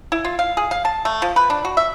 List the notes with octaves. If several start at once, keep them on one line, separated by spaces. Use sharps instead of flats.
E4
F4
F5
G#4
F5
A5
A3
F3
B4
D4
F#4
E5